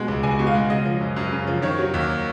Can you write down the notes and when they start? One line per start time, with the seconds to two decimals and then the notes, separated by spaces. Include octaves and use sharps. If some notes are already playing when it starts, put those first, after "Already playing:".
Already playing: B2 G#3
0.08 C#2
0.23 C#2 G#5
0.39 B2
0.47 F5
0.55 G#3
0.70 C#3 D#5
0.85 F3
1.01 F#2
1.16 F#2
1.32 C#3
1.47 F3
1.62 D#3 C#5
1.79 F#3
1.94 D#2